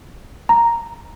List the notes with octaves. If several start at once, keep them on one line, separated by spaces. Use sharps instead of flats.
A#5